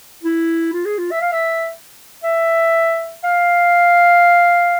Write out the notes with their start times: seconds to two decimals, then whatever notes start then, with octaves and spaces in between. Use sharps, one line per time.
0.23 E4
0.73 F4
0.85 G#4
0.98 F4
1.11 E5
1.21 F5
1.32 E5
2.24 E5
3.24 F5